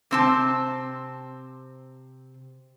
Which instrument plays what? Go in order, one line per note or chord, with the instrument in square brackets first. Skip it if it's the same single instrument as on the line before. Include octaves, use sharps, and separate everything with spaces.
[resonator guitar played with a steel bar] C3 C4 A5